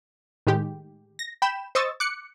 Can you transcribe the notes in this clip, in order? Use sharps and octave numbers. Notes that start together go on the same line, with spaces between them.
A2 D#3 G#3 G4
A#6
G5 B5 G6 E7
C5 D#5 C#6 D#6 E6 A6
D6 F#6 C#7